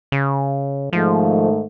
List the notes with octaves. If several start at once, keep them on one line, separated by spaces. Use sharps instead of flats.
C#3
G#2 D#3 F3 A3